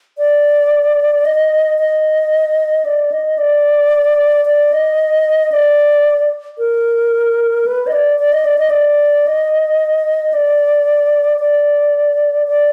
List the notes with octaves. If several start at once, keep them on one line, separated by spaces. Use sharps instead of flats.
D5
D#5
D#5
D5
D#5
D5
D5
D#5
D5
A#4
B4
D#5
D5
D5
D#5
D5
D#5
D5
D#5
D5
D5
D5